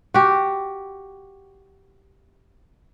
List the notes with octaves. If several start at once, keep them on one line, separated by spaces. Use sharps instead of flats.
F#4 G4